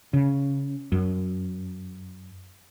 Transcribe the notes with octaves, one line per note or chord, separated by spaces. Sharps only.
C#3
F#2